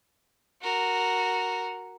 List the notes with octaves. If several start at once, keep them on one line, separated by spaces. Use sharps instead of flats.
F#4 A#4